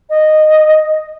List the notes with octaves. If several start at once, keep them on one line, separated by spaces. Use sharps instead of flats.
D#5